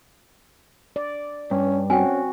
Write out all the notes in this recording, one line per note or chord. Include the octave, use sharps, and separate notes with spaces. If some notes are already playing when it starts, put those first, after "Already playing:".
D5
G2 C#4
C4 C#4 F#4 G5 G#5